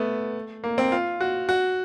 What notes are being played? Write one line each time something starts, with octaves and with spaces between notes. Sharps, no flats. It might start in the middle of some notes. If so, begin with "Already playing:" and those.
Already playing: A3 B3
A#3
C4
F4
F#4
F#4